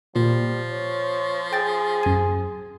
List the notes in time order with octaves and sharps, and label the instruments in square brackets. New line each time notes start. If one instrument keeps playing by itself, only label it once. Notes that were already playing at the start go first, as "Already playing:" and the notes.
[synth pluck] A#2 [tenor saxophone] F3 [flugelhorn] G3
[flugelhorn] C#5
[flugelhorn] G#4 [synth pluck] G5 A6
[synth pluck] F#2 G#5